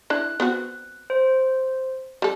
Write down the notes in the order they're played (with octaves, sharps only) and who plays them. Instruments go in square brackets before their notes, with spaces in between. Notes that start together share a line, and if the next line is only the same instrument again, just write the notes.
[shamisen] D4 E4 [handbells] F#6
[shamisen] B3 C4 F#4
[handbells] C5
[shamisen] G3 A4